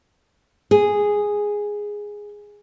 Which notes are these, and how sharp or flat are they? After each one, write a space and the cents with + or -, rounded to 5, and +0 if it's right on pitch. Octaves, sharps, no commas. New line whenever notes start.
G#4 -5